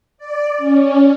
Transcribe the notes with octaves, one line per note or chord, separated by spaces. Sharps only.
D5
C#4